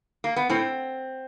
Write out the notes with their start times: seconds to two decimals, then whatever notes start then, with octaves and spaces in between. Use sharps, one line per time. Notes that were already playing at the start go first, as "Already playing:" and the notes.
0.24 A#3
0.36 B3
0.49 A2 C4